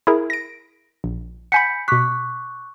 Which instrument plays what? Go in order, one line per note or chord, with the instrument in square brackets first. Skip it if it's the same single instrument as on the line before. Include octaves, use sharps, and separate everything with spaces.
[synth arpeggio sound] E4 G#4 A#4
A#6 D7
A#1
[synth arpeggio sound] F#5 G#5 B5 [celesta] G6 B6 C#7
[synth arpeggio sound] B2 B6 [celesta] C#6 D6 F#6